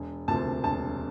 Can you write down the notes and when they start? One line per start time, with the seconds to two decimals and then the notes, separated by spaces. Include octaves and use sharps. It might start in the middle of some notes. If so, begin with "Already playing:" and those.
Already playing: E1
0.28 D2 C3 F3 A#3 A5
0.64 E1 A5